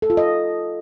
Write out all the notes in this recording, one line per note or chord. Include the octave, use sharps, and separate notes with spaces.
A4
F4
D#5